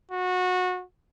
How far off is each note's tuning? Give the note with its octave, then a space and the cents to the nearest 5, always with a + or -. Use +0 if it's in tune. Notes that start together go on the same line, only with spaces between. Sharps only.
F#4 -25